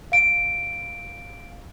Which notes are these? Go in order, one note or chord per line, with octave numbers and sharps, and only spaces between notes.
F5 D7